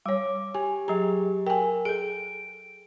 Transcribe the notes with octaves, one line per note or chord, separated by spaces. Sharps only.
G3 C#5 D6
G4 G#5
F#3 G4 G#4 A#5
A#4 G5 G#5
G#4 A4 D7